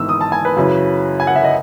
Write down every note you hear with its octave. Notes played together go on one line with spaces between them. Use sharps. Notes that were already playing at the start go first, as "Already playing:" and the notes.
Already playing: G#1 G#2 E3 B3 D#4 E6
D#6
A5
G#5
B4
F#2 C#3 F#3 C#4 E4
G#5
F#5
E5
D#5